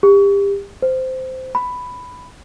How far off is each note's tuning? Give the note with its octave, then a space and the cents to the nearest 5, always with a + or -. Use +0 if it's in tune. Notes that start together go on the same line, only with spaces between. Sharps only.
G4 +30
C5 -10
B5 +5